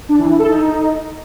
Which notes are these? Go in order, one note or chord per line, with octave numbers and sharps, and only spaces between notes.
D4
E3
E4
A4
D#4